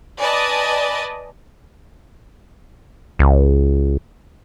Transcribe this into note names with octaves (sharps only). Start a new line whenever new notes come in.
B4 D5 D#5 G#5 A5
C#2